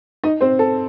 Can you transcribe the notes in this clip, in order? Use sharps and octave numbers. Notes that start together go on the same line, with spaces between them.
D#4 D#5
C4 C5
A4